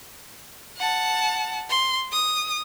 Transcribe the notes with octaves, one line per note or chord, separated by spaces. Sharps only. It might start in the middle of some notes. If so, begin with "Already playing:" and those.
F#5 A5
C6
D#6